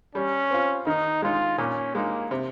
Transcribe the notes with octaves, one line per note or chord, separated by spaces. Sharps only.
G3 C#4
C4 F4
D#3 D#4
G#3 D#4 F4
A#2 C#4
G#3 A#3 D#4
C3